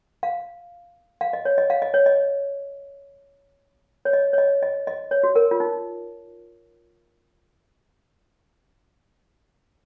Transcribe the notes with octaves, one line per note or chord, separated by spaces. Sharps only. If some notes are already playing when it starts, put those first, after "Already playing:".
F5
F5
D#5
C#5
D#5
F5
D#5
C#5
D#5
C#5
D#5
C#5
D#5
D#5
D#5
C#5
F#4
A#4
F4
D#4